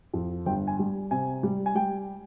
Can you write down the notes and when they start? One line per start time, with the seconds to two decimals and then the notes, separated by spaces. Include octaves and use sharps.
0.14 F2
0.46 G1 G5
0.67 G#5
0.79 G3
1.11 C3 G#5
1.43 G3
1.66 G#5
1.75 G3 G5